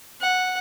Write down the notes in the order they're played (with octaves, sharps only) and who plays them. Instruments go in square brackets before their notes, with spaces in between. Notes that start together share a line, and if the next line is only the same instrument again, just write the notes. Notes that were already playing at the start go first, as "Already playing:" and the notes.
[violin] F#5